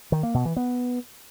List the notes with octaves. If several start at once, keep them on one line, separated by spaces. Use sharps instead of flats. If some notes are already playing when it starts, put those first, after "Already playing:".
D#3
A#3
B2
E3
B3